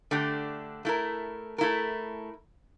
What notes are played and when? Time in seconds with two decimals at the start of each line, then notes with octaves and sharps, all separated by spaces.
0.11 D3 A3 D4 G4
0.85 A3 E4 A#4
1.58 A3 E4 A#4